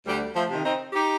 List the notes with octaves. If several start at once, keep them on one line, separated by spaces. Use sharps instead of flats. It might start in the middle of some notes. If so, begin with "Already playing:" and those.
D2 G3
F3 A3
C3 D#3
C4 D#4
D#4 G4